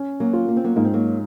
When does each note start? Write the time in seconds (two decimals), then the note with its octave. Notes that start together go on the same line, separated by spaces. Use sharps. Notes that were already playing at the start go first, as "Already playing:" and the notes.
Already playing: C#4
0.20 F#3 A#3
0.33 F4
0.48 A#3
0.57 C4
0.64 F#3 A#3
0.76 G#2 A#3
0.85 C4
0.94 F#3 A#3